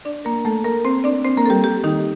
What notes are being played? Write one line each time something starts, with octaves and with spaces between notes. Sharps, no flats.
D4 D5
A#3 A#4
A3 A4
A#3 A#4
C4 C5
D4 D5
C4 C5
A#3 A#4
A4
G3 G4
G3 G4
D#3 D#4